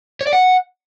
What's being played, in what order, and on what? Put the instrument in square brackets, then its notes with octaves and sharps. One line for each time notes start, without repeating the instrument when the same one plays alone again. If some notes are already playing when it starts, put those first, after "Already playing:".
[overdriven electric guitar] C#5
D5
F#5